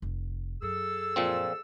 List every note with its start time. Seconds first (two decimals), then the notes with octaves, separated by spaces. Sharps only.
0.02 F1
0.62 F#2 G#4 A4 E6
1.16 A#2 F3 C4